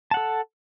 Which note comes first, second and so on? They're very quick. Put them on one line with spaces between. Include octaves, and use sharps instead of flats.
A5 F#5 A4